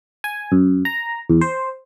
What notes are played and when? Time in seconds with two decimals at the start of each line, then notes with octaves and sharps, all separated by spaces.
0.24 G#5
0.52 F#2
0.85 A#5
1.30 E2
1.41 C5